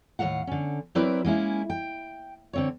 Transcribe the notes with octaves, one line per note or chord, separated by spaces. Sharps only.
D#2 A2 F#3 G#3 F5 F#5
D3 C#4
F#3 C4 E4 A#4 B4 D5
G#3 A#3 C#4 E4
G5
D3 C4 C#5